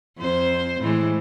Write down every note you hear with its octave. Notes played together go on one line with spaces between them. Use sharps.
F2 C5
A2 E3 G#3